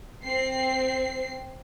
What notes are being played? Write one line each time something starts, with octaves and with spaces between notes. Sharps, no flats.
C4 C7